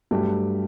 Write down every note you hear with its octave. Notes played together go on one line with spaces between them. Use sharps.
G2 F#3 A3 G4